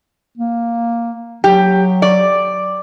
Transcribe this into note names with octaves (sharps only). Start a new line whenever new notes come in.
A#3
F#3 G4
D5